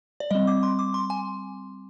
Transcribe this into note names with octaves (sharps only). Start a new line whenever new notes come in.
D5
G3 C4 D#5
D6
C6
D6
C6
G#5